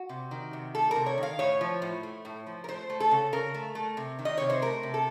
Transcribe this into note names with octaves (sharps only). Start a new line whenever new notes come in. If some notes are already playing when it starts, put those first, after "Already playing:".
Already playing: F#4
C3
D#3
C3
A3 A4
C3 A#4
C#5
D#3
F5
A2 C#5
F3
A2
A3
A2
F3
A#4
A3 C5
A3
A4
C#3
C#3 A#4
A3
A3
C3
D#3
D#5
C3 C#5
C5
A3 A#4
C3
A4